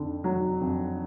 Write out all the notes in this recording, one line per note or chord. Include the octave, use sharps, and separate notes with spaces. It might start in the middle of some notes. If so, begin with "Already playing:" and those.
Already playing: F2 D3
F#3
F2